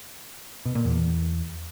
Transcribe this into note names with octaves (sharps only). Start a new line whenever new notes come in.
B2
A#2
E2